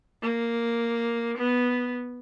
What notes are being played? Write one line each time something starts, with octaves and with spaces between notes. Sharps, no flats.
A#3
B3